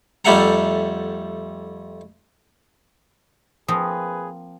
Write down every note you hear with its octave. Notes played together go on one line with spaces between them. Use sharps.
F2 G3 A3 E5 F#5 A#5
F3 A#3 C4 G#4 B4 D#6